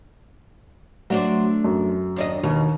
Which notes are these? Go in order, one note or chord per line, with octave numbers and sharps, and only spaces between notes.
F#3 A3 D4 C5
F#2
D#2 D4 D#5
D#2 B2